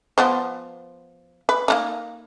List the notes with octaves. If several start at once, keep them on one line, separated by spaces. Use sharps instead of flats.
F3 B3 C5
B4
A#3 D4 D#4